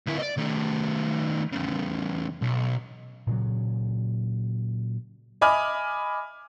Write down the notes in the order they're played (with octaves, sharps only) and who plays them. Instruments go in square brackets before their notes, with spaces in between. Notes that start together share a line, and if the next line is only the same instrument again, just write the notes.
[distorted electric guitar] D2 E4
D5 D#5
D#3 A3
E2 C#3
B1
[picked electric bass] A#2 C#3 F#3
[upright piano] D#5 E5 G#5 B5 D6 F6